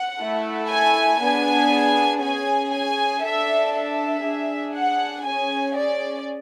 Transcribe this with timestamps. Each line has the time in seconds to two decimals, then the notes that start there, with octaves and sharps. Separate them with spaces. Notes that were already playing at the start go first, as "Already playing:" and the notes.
Already playing: F#5
0.20 A3 E4 A4
0.70 G#5
1.20 B3 D4 G#4 G#5
2.21 C#4 G#4 G#5
2.72 G#5
3.23 D4 A4 E5
3.74 E5
4.24 D4 G#4
4.75 F#5
5.25 C#4 G#4 G#5
5.75 D5